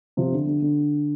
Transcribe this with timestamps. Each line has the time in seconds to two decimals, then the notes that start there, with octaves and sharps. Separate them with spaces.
0.17 C3 F3
0.32 D3
0.47 D3
0.62 D3